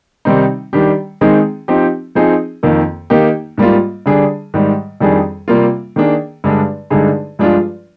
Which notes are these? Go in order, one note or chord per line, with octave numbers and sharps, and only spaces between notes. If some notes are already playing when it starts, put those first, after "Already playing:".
C3 D#3 G3 C4 D#4
D#3 G3 D4 G4
D#3 G#3 C4 D#4 G#4
F3 C4 D#4 G4
F3 C4 D#4 G#4
F2 D#3 A#3
D#3 A#3 D#4 G4
G#2 G3 A#3 F4
D3 G3 D4 G#4
G#2 D#3 G3
F2 D#3 G3 D4 G#4
C3 G3 A#3 F4
D#3 A#3 D4 G#4
G2 D3 G#3 D4
G2 D3 G#3 D#4 G#4
G2 F3 G#3 D4 F4